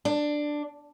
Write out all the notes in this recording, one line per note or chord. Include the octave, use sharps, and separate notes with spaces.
D4